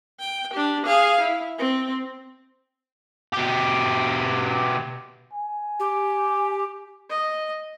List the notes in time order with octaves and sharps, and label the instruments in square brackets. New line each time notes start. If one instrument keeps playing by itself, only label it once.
[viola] G5
D4 G4
G#4 F5
E4
C4
[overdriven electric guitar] B2 G4
[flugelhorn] G#5
[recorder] G4
[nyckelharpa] D#5